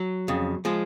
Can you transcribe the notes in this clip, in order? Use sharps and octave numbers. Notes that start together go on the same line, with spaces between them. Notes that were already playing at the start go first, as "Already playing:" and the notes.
Already playing: F#3
F2 C#3
F3 G#3